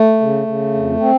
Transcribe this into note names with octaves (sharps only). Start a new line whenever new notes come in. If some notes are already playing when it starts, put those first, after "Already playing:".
Already playing: A3
C#3
C#3
F2
C4